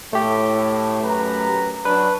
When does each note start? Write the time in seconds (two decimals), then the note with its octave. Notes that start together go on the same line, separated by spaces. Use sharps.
0.13 A2 A3 G4
1.03 F#2 B4 A#5
1.85 F#3 D4 B4